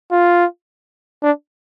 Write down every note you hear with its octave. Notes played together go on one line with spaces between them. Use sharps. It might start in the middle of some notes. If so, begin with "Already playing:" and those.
F4
D4